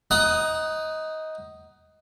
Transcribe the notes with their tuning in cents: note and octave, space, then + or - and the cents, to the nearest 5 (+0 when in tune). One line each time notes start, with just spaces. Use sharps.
D#4 +20 F#5 +20 D#6 +0